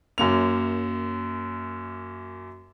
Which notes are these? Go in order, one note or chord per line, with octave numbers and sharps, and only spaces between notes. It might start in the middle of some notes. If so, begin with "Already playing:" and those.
F#2 A#3 F7